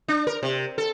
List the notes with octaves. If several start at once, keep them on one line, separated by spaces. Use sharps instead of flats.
D4
A#4
C3
A4